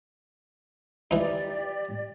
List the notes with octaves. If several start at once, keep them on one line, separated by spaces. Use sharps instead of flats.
E3 D#4 G4 D5